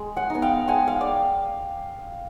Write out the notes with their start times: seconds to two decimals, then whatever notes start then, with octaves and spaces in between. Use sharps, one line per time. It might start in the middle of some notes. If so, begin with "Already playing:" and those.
Already playing: G#3
0.16 F#5 G#5
0.30 B3 D#4 G#5
0.42 F5 G5
0.68 G#3 F#5 G#5
0.87 F5 G5
1.01 D5